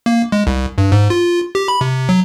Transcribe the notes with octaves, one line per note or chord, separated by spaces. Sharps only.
A#3
G#3
C2
G2
G#2
F4
G4
B5
C3
F#3